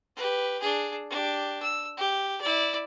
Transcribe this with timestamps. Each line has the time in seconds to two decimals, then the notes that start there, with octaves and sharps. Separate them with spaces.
0.16 G4 B4
0.61 D4 G#4
1.10 D4 G4
1.63 E6
1.97 G4
2.41 E4 D5